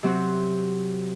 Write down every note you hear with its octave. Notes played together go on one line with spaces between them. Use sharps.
C3 F#3 C4 F#4